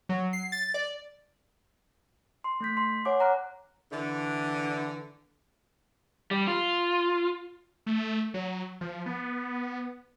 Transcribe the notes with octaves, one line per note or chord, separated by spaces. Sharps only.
F#3
C7
A6
D5
C6
A3 G6 B6
C6
C#5 F#5 G#5 D6
F#5 A#5 D6 F6 F#6
D3 E3
G3
F4
A3
F#3
F3
B3